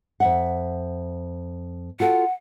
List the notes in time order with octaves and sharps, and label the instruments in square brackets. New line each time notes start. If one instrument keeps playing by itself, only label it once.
[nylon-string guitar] F2 E5 F#5
[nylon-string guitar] F4 F#4 A4 [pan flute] F#5